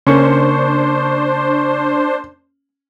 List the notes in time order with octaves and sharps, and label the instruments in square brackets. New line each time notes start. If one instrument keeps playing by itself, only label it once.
[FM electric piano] C#3 C#6 [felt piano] A#3 C#4 [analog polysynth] D4 C5